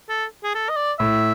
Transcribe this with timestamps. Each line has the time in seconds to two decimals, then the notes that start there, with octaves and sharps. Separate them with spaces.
0.09 A4
0.44 G#4
0.55 A4
0.69 D#5
0.77 D5
0.99 A2 E5